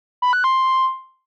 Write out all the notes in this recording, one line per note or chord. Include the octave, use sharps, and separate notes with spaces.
B5
F#6
C6